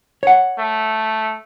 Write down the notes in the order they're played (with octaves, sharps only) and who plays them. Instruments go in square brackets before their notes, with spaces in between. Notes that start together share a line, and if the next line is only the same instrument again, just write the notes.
[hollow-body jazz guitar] C#5 F#5
[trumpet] A3